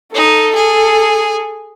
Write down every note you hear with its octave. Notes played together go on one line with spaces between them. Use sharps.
D#4 A4
G#4